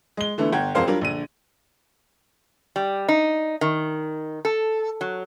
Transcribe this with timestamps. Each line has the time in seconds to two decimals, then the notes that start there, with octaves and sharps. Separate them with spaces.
0.17 G#3 G7
0.38 D3 E3 A3 B3 D4 E4
0.52 G1 F#5 G5 G#6
0.75 E1 F2 A#4 C5 F5 G5
0.87 F#3 G3 D4 F4 A#4
1.01 A#1 D3 D#7
2.76 G3
3.08 D#4
3.61 D#3
4.45 A4
5.01 F#3